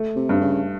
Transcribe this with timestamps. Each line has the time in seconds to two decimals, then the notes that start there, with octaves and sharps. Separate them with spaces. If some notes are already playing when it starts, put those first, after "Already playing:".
Already playing: A3
0.16 C3
0.29 G2
0.41 C#3